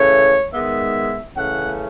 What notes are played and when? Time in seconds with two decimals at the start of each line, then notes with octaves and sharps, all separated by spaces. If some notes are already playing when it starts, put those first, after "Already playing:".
Already playing: C#3 E3 A3 C#5
0.54 G#2 D#3 G#3 B3 E5
1.35 C#3 E3 A3 C#4 F#5